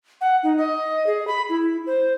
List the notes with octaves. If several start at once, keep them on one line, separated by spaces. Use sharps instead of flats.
F#5
D#4
D#5
G#4
B5
E4
C5